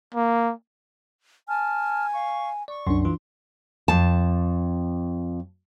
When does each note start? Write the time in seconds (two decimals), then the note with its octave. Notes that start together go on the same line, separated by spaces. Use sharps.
0.14 A#3
1.48 G#5 A5 F6
2.13 F5 C#6
2.68 D5 C#6
2.87 C2 F#2 D4 C6
3.05 E3 F4
3.88 F2 A5